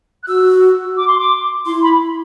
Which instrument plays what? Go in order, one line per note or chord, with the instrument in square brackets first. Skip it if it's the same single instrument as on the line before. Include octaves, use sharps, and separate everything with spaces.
[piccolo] F#6
[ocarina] F#4 [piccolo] E6
[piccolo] D6
C6
D6
[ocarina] E4 [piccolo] C6
[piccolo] B5